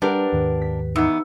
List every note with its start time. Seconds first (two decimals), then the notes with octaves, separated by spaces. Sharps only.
0.02 G3 D4 G4 A#4 B4 F#5
0.32 D#2 G#2 D#3
0.62 B6
0.96 E2 B3 D#4 E6